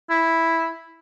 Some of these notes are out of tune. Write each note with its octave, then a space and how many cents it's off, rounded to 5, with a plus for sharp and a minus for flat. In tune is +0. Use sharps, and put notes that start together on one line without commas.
E4 -5